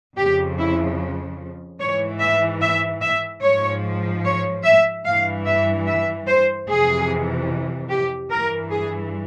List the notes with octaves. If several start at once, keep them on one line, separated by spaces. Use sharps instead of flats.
F2 C#3 F3 G4
E4
G#2 E3 C#5
E5
E5
E5
G#2 F3 C#5
C#5
E5
G2 E3 F5
E5
E5
C5
F2 C3 E3 G#4
G4
G2 E3 A#4
G#4